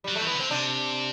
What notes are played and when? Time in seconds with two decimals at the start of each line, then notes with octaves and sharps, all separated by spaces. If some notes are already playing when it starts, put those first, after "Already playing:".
0.04 F#3 G3
0.16 A3
0.22 E3 B3
0.36 D3 C4
0.50 C3 D4